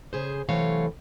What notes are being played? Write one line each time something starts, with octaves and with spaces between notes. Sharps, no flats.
C#3 G#4 C5
C3 E3 F#3 A3 C#5 F5